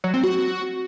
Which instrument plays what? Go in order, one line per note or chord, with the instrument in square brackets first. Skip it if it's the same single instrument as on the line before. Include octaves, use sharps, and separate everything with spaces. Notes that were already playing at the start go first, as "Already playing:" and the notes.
[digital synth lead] F#3
C4
F#4